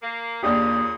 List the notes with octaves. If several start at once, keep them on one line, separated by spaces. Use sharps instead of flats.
A#3
D#2 A#2 C#3 D4 G4 D#6